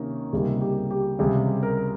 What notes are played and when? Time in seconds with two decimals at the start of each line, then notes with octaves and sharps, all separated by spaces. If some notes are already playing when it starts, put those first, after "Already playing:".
Already playing: C3 D#3 A#3 C#4
0.33 C#2 C3 G3 A#3 D#4 G#4
0.61 G4
0.91 G4
1.19 C#2 C3 G3 G#4
1.63 A#4